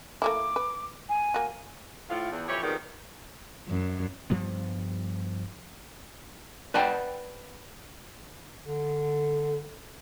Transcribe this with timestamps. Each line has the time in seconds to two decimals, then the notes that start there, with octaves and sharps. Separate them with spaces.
0.22 A3 A#3 E4 D6
0.56 B4
1.09 G#5
1.34 A#3 F#4
2.09 A2 F4
2.31 E2
2.48 F2 E3 G4 C#5
2.63 F2 G#2 D#3 G3 B3 A#4
3.68 F#2
4.30 G2 F3 G3 B3
6.74 B4 D5 F#5 G5 A5
8.65 D3